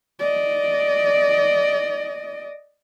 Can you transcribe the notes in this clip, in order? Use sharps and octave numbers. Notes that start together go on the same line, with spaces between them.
D5 D#5